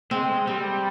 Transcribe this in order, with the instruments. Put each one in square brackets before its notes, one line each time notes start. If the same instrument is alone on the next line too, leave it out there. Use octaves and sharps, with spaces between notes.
[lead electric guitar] G#3 [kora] C4
[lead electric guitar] G3 [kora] C4